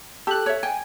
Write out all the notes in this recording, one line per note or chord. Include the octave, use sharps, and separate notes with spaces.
G4 A4 F#6
C#5 E5
G5 G#5